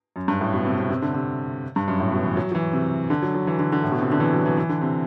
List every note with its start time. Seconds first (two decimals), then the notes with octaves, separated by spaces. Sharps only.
0.16 F#2
0.28 G2
0.41 A2
0.54 B2
0.66 C3
0.78 C3
0.90 C3
1.02 D3
1.14 C3
1.76 G2
1.88 F#2
2.00 A2
2.12 B2
2.25 E3
2.37 F#3
2.52 F#3
2.55 E3
2.73 C3
3.10 D3
3.22 F#3
3.34 F#3
3.47 E3
3.59 D3
3.72 D3
3.83 A2
3.92 B2
4.02 C3
4.12 D3
4.20 E3
4.33 F#3
4.46 E3
4.57 E3
4.69 D3
4.81 C3